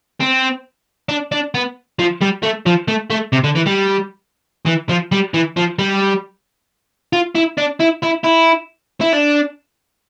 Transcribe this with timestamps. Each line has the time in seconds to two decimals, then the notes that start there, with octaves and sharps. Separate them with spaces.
0.21 C4
1.09 D4
1.32 D4
1.55 B3
1.99 F3
2.22 G3
2.43 A3
2.66 F3
2.88 A3
3.10 A3
3.33 C3
3.44 D3
3.56 E3
3.67 G3
4.66 E3
4.89 F3
5.12 G3
5.34 E3
5.57 F3
5.79 G3
7.13 F4
7.35 E4
7.57 D4
7.80 E4
8.03 E4
8.24 E4
9.01 E4
9.13 D4